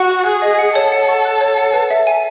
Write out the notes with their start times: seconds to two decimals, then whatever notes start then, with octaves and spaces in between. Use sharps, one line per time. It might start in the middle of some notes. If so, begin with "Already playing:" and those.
Already playing: F#4 F#5
0.10 C#6
0.26 G#4 F#6
0.42 D#5
0.59 F#5
0.75 A4 C#5
0.92 F#5
1.08 C#6
1.25 F#6
1.41 C#5
1.57 F#5
1.74 B4
1.91 E5
2.07 G#5